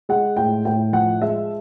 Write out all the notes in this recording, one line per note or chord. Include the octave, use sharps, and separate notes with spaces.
G#3 F#5
A2 G5
A2 G5
F3 F#5
G#3 E5